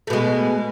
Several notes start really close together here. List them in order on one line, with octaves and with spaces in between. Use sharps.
A3 B2 G#3